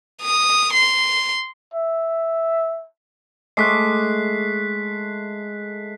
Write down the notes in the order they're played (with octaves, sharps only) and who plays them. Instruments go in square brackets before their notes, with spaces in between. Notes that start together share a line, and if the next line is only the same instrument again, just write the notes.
[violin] D#6
C6
[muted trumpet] E5
[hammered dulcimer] G#3 A3 D6 [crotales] F#6 B6 C7